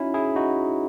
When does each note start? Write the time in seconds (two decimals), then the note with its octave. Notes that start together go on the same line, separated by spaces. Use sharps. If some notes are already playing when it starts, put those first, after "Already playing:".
Already playing: C#4 D#4 E4 F#4
0.14 E4 G#4
0.36 D#4 F#4